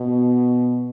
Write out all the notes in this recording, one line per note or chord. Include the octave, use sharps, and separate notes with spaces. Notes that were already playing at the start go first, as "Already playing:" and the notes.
Already playing: B2